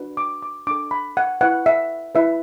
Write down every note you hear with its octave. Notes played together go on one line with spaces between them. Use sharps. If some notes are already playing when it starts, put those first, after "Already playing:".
Already playing: D4 F#4 B4
D6
D6
D4 A4 D6
B5
F#5
E4 B4 F#5
E5
E4 B4 E5